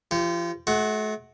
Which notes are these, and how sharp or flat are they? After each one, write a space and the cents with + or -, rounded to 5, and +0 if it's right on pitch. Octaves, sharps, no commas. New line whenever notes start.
F3 -35 G4 +0
A3 -40 F#4 +5